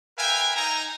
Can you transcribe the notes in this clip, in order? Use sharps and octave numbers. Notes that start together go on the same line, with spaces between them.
A#4 B4 E5 F5 G5 G#5
D#4 G#5 A#5